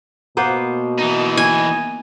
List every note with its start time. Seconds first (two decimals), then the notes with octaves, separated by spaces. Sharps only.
0.37 B2 A#3 B3 C5
0.99 E3 D#4
1.37 G#5